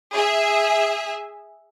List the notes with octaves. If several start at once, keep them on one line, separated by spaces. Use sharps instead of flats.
G#4 E5